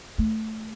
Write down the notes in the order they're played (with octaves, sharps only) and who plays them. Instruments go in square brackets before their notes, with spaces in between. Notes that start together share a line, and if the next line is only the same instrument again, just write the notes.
[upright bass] A3